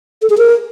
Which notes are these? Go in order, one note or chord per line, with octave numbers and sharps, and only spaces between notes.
A4
G#4
A#4